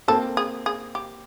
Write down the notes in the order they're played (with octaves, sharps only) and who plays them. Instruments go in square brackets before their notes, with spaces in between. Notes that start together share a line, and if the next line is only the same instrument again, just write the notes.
[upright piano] A#3 C4 [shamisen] A4
[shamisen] G#4
G#4
G4